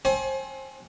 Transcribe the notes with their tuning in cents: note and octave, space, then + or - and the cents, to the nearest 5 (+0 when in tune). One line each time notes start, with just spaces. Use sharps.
C4 +25 C5 +35 G#5 +30